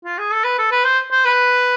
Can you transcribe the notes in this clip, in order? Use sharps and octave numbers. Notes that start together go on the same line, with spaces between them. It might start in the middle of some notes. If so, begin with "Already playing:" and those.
F4
G#4
A4
B4
A4
B4
C5
C5
B4